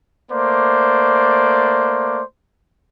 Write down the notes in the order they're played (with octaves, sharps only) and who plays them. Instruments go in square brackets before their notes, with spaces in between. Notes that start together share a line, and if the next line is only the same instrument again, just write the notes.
[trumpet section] A3 A#3 C5 D5